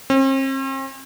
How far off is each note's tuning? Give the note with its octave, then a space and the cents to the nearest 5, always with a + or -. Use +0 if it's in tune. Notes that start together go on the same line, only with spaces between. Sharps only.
C4 +45